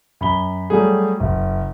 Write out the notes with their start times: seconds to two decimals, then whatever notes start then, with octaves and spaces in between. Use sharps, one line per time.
0.21 F#2 B5 G7
0.70 F#3 G3 A3 G#4
1.20 F#1